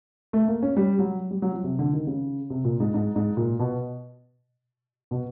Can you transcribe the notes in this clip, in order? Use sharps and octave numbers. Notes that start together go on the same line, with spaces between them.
A3
A#3
C#4
G3
F#3
G3
F#3
F3
C3
D3
D#3
C#3
C3
A#2
G#2
G#2
G#2
A#2
B2
B2